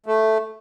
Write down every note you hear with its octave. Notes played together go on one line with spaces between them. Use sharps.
A3